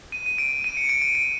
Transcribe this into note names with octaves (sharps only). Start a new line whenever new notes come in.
D#7
D#7
D7
D#7
C#7
D7
D7
D7